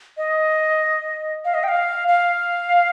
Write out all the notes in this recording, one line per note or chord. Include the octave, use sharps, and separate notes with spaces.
D#5
F5
D#5
G5
F5
F5